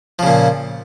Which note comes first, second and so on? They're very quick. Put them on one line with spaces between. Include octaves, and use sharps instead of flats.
F3 C#3 A#2